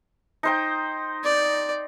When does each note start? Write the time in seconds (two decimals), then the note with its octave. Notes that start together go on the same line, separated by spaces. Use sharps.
0.43 D#4 C5 G5
1.24 D5